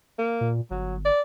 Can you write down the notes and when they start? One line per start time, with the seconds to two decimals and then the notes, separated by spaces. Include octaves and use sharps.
0.19 A#3
0.41 A#2
0.71 G1 F#3
1.05 D5